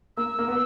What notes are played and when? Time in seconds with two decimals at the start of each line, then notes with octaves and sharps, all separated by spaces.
0.17 A#3 E6
0.39 A#3
0.48 B3